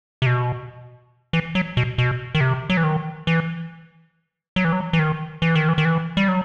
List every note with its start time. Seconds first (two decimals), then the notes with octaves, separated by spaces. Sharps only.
0.22 C3
0.26 B2
1.33 E3
1.55 F#3
1.77 B2
1.98 B2
2.35 D#3
2.41 C3
2.70 F#3
2.77 E3
2.84 D#3
3.27 E3
4.56 F#3
4.65 E3
4.73 F#3
4.93 E3
4.99 D#3
5.42 E3
5.55 D#3
5.68 E3
5.78 D#3
5.85 E3
6.17 G3
6.28 F#3